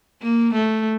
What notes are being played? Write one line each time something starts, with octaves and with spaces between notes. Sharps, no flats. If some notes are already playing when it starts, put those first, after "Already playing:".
A#3
A3